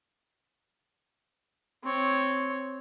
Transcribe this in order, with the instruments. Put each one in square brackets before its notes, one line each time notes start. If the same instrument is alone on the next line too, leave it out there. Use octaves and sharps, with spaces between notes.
[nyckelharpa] C4 C#5